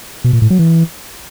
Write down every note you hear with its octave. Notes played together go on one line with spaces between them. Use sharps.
B2
A#2
A2
F#3
E3